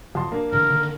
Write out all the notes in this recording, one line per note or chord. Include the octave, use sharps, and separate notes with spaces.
F2 A5 C6
A#3 D4
A#2 D3 E3 A#4
D3 D#3